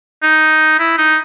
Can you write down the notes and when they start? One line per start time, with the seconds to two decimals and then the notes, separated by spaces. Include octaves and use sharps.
0.22 D#4
0.79 E4
0.98 D#4